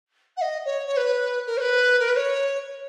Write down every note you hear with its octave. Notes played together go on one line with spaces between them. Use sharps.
F#5
D#5
C#5
C#5
B4
A#4
C#5
B4
A#4
B4
C#5